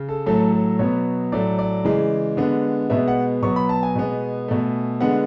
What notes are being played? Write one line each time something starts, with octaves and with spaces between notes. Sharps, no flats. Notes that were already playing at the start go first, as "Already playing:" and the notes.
Already playing: C#3
A4
A2 F#3 A3 A4
A4
B2 F#3 B3 C#5
A2 F#3 A3 D5
D5
C#3 E3 G#3
D3 G#3 B3
B2 G#3 B3 E5
F#5
B2 F#3 B3 C#6
B5
A5
G#5
B2 G#3 B3
B2 A3
D3 G#3 B3 F#5